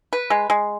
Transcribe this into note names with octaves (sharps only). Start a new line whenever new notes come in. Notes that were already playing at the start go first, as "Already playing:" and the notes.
B4
G#3
G#3